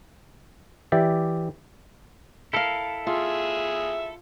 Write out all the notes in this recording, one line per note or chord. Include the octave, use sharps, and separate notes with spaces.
E3 G4 D5 E5
E4 A4 A#4 F5
F4 G#4 E5